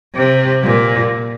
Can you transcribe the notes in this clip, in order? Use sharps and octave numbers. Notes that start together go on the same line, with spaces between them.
C3
A#2